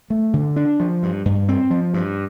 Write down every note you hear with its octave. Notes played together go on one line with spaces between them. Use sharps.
A3
D3
D4
F3
G2
G2
C4
F3
G2